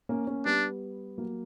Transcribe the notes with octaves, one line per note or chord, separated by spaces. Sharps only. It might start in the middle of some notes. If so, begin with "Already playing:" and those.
A#3 C#4
A#3 C#4
G3 B3 D4
F#3 A#3